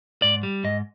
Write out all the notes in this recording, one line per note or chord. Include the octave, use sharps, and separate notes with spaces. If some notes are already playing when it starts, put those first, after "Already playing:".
G#2 D5
G3
G#2 D#5